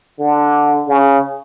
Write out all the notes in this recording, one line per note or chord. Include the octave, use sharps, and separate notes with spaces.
D3
C#3